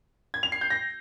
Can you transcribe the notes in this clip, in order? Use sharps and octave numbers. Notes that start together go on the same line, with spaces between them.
G#6
F7
C7
G6
A#6